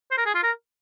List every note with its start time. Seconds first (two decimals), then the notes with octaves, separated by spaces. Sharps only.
0.11 C5
0.17 A#4
0.26 G#4
0.34 F4
0.43 A#4